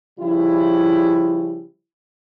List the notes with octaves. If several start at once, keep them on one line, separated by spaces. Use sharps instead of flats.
C#3 F3 G3 E4